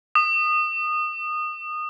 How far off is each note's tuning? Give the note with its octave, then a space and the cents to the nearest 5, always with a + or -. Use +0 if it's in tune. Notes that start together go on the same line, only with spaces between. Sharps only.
D#6 -20